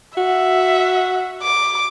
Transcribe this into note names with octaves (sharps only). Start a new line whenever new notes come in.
F#4 E5
D6